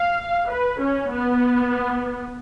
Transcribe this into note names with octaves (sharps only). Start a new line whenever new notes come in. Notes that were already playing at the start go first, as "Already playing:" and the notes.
Already playing: F5
B4
C#4
B3